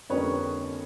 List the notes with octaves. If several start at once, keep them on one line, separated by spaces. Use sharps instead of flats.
F2 D3 G3 A#3 C#4 B4 C#5